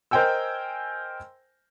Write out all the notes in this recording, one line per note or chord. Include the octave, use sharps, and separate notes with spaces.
A#4 C5 D#5 G5 G#5 E6